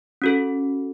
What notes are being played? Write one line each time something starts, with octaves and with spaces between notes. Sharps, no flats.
C#4 F#4 A4